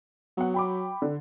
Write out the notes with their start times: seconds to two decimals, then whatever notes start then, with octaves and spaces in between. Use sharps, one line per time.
0.37 F#3 B3 F#5
0.54 G5 B5 D6
1.02 D3